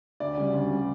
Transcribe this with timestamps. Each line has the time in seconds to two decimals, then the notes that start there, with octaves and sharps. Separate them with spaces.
0.20 D2 D5
0.37 C#3 G3
0.54 D2
0.71 C#3 G3